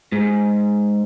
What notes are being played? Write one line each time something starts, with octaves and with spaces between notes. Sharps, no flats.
G#2